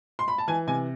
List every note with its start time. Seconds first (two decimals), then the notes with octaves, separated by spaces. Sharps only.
0.19 C6
0.28 B5
0.38 A5
0.48 E3 G#5
0.67 C3 G#5